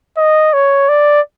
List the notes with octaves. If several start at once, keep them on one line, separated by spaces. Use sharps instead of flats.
D#5
C#5
D5